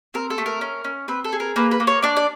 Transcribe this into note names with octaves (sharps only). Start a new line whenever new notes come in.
C4 A#4
A4
A3
A#4
C#4
C#4
C4 B4
A4
G#4
A#4
A#3 B4
B4
A#3
C#5
D4 D5
D5